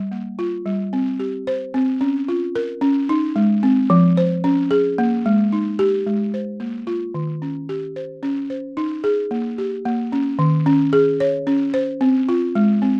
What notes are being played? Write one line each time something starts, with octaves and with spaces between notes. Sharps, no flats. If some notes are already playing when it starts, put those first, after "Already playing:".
Already playing: G3
A#3
F4
G3
C4
G4
C5
C4
C#4
F4
A#4
C#4
D#4
G#3
C4
F3
C5
C#4
G#4
A#3
G#3
D#4
G4
G#3
C5
A#3
F4
D#3
C#4
G4
C5
C#4
C5
D#4
G#4
A#3
G4
A#3
C#4
D#3
C#4
G#4
C#5
C#4
C5
C4
F4
G#3
C4